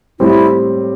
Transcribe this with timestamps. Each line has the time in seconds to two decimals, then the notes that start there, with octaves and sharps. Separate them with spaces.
0.20 A2 G3 C4 E4 G4 C5